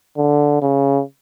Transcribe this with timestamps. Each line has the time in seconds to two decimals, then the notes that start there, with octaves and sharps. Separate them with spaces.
0.17 D3
0.62 C#3